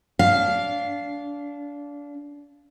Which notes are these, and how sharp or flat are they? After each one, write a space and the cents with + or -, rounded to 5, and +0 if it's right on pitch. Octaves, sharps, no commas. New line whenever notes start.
D4 -25 F5 +0